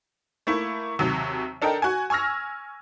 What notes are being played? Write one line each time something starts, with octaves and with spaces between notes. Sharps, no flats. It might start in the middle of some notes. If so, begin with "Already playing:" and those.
A3 A#3 E4
D#2 C3 F#3
D4 A4 A#4 D#5 G5
F#4 G#5
G#5 C#6 E6 F6 A#6